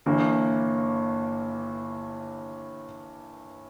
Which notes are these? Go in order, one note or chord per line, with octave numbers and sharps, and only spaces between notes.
G1 G2 E3 A#3